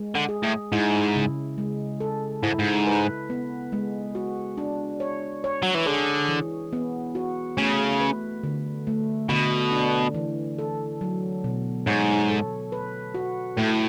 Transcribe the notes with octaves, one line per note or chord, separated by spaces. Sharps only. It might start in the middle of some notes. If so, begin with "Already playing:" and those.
Already playing: G#3
D3
G#4
A2
G#2 E4
C#3
G#3
A4
G#2 E4
G#2
B4
B3
G#3
F#4
D4
C#5
C#5
F#3
E3
D3 G#4
E3
B3
F#4
C#3 A3
B4
D3
A3
B2 D3
D4
E3
A4
F#3
B2
G#2 C#5
A4
B4
F#4
A2 A3